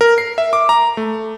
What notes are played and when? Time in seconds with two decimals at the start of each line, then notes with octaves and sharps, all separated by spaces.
0.01 A#4
0.18 C7
0.38 E5
0.53 D6
0.69 A#5
0.97 A3